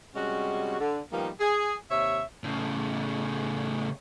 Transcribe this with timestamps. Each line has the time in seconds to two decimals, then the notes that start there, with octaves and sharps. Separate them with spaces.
0.16 C3 G3 G#3 C#4 F#4
0.80 D3
1.13 D#3 F3 G3 A#3 B3 D#4
1.41 G#4
1.91 D#2 C3 C#5 E5
2.44 A2 C#3